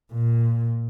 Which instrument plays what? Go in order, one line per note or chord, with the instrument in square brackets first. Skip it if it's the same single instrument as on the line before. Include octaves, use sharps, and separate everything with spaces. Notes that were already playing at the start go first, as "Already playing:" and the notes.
[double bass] A#2